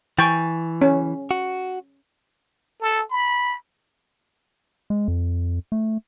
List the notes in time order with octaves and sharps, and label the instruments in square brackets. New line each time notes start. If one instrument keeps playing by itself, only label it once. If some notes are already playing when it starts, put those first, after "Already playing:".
[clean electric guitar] E3 [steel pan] G5 [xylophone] G#5 C#6 A6
[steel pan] C#4
[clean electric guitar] F#4
[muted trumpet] A4
B5
[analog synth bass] G#3
F2
A3